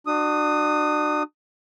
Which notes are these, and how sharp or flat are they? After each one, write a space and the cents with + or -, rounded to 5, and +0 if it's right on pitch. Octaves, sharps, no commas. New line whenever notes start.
D4 +35 F#4 +0 D#6 +0